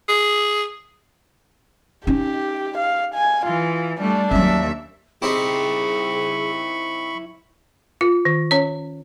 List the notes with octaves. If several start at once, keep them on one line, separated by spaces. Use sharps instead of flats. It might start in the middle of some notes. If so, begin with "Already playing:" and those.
G#4
C#4 D#4 G4
F5
G#5
E3 F4
G3 A3 D4
D#2 F#3 C#4 E5
C4 D#4 E4 G4 G#4 C5 B5 C#6
F4
D#3
C#4 C#5